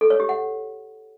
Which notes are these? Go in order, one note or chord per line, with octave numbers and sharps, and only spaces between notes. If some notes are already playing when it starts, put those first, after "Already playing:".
A4
C#5
G4
F#5